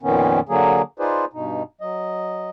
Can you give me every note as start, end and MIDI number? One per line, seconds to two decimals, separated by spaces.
0.03 0.40 41
0.03 0.40 46
0.03 0.40 51
0.03 0.40 59
0.03 0.40 61
0.49 0.82 50
0.49 0.82 54
0.49 0.82 58
0.49 0.82 68
0.99 1.25 63
0.99 1.25 65
0.99 1.25 68
0.99 1.25 71
0.99 1.25 72
0.99 1.25 74
1.33 1.63 43
1.33 1.63 47
1.33 1.63 63
1.81 2.50 54
1.81 2.50 75